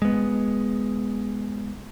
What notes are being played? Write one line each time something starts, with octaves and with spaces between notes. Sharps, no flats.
G#3 B3